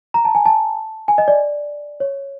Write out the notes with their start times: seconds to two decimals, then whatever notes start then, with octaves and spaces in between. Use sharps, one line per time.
0.14 A#5
0.25 A5
0.35 G#5
0.46 A5
1.08 G#5
1.18 D#5
1.28 D5
2.00 C#5